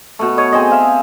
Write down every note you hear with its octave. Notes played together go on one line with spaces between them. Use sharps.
B2 A3
C#5 D#5
C4 G#4 C5 D#5
E5 F5